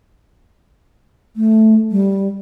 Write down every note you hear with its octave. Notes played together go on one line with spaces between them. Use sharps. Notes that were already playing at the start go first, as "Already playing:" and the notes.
A3
G3